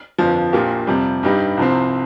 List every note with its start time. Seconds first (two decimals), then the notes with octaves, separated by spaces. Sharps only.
0.18 G1 F2 F3
0.53 A#1 A#2 A#3 G4
0.87 F2 C3 G3
1.23 G2 G3 D#4 G4
1.57 C2 C3 F3 C4